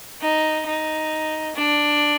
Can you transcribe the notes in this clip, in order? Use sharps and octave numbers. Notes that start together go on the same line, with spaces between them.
D#4
D#4
D4